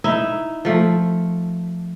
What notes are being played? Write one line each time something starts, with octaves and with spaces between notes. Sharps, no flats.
D#4 E4 E5
F3 A3